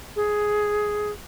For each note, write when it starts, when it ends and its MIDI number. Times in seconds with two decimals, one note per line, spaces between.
0.16 1.11 68